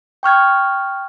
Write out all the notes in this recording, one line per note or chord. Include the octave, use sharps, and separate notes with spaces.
G5 C#6 F6 G#6